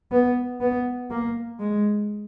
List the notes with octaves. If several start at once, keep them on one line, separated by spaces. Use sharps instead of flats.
B3
B3
A#3
G#3